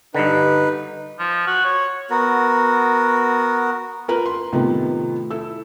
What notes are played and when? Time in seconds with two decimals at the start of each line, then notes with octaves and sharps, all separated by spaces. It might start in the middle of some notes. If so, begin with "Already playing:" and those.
0.15 G2 D3 D#4 B4
1.19 F3
1.47 F#4
1.65 C#5
2.10 B3 F#4 A#4
4.08 F4 A#4 B4
4.26 C6
4.52 A2 C3 D#3 F3 A3 B3
5.31 E4 A4 E6